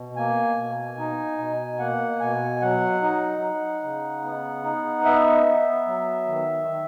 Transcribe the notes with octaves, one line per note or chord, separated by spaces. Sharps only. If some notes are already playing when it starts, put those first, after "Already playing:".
Already playing: B2
A#3 G#5
B2
D#4
B2
A#3 F#5
B2 G#5
F#3 F#5
D#4
D#4
C#3
B3
D#4
B3 E5
B3
F#3
D#3
D#3